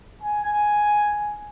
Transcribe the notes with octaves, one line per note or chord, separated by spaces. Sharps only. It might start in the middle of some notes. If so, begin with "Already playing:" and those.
G#5